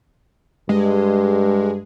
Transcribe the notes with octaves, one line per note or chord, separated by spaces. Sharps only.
G2 G#3